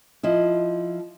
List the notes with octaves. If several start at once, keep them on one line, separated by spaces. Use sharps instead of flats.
F3 E4 D#5